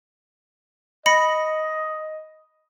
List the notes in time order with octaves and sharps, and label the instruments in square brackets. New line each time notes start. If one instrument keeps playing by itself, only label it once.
[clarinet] D#5 [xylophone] B5 A#6 C#7